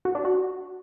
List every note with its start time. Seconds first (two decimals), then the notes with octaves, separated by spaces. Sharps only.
0.05 F#4
0.15 D4
0.25 F#4